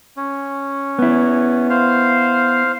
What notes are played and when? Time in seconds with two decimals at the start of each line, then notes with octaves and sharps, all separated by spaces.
0.17 C#4
0.99 B3 E4
1.70 C5 F5